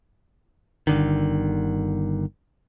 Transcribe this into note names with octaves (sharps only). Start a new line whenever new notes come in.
G1 D3 D#3